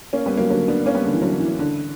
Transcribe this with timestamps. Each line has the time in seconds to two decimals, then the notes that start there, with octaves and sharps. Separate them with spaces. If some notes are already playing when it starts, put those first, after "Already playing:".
0.13 A#3 C#4
0.26 G3 B3
0.37 F#3 A#3
0.50 D3 F#3
0.68 B3 D4
0.86 A#3 C#4
0.95 G3 B3
1.04 D3
1.14 E3
1.22 D3 F#3
1.40 E3
1.59 D3